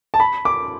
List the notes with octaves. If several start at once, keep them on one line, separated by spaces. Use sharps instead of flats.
A5
B5
D6